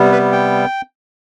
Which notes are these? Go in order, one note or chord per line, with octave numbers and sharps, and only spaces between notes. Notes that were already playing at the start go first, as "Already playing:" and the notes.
Already playing: C3 G3 B3
B4
G5